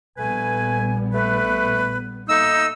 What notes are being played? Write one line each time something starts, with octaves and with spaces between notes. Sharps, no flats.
A#1 G3 A3 B3 B4 G#5
A3 B4
A3 A#3 D#4 E6